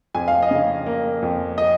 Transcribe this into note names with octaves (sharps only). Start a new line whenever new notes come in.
F2 G#5
F5
D#5
C#3 F5
A#3
F2
D#5